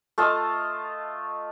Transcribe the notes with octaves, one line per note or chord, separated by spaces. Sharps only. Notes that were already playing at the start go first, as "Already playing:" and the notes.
A3 F4 D#5 A5